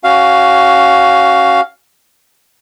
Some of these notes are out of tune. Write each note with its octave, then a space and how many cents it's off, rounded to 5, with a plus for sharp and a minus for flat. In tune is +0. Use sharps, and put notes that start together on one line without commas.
C#4 +0 F#4 +15 F5 +0